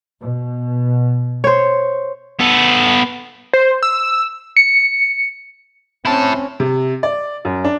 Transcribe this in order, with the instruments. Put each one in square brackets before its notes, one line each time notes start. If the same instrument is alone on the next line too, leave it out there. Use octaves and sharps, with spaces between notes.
[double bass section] B2
[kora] C5 C#5
[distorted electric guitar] B3 A4
[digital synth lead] C5
E6
[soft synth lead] C#7
[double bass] C4 C#4 [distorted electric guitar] E4 A5
[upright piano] C3
D5
F#2
D4